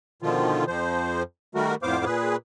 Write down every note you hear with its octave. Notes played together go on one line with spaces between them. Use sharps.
B2 D3 D#3 F3 F4
F2 F3 C5
D#3 G3 A3 F#4 A#4
F2 A2 B3 C5 F5 D6
A#2 G#4 B4